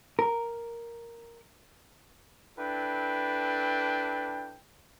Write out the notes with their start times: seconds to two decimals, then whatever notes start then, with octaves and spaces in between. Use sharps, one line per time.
0.19 A#4
2.58 D4 E4 A4 B4 G5